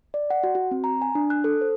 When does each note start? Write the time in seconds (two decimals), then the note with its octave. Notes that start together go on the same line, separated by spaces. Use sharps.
0.14 D5
0.30 F#5
0.44 F#4
0.55 F#4
0.71 C4
0.84 A#5
1.02 G#5
1.15 D4
1.30 F#6
1.44 A4
1.61 C5